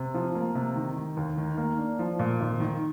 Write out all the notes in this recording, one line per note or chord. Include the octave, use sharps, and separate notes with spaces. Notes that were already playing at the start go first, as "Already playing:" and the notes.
Already playing: C3
F3
A#3
C3
D#3
D#3
D#2
D#3
A#3
D4
F3
A#2
G#1
D#3